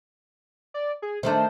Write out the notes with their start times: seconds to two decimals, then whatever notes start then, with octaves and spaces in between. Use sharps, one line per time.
0.74 D5
1.02 G#4
1.23 D#3 A3 D4 C5